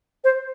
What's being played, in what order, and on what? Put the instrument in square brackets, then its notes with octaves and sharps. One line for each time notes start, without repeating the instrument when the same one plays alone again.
[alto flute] C5